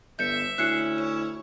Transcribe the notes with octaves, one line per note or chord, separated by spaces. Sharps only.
G1 E5 G6 C#7
D2 C#4 E4 F#6 C7 C#7
C#5 E7